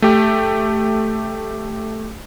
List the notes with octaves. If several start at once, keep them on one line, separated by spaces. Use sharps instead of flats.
A3 G4